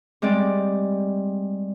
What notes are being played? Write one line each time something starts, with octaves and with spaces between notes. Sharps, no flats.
G3 G#3 C4 D5